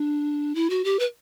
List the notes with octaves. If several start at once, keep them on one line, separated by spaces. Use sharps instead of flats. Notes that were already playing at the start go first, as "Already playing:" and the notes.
Already playing: D4
E4
F#4
G4
B4